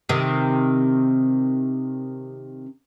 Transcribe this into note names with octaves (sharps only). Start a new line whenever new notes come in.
C3 D#3